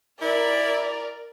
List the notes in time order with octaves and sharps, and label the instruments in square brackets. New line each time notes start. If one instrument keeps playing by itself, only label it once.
[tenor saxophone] E4 [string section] A#4 [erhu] D5